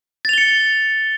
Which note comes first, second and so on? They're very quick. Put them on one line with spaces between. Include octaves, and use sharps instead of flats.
A6 F7 G7 C#7